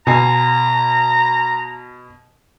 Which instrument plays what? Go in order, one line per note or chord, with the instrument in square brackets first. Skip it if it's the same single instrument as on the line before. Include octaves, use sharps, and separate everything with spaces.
[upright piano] B2 G#5 C7 [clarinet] A#5